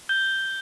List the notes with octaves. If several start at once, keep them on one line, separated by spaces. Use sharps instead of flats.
G6 G7